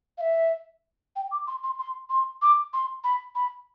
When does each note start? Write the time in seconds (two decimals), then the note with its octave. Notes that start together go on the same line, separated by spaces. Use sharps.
0.18 F5
0.21 E5
1.16 G5
1.32 D6
1.47 C6
1.64 C6
1.79 C6
2.10 C6
2.42 D6
2.73 C6
3.04 B5
3.35 B5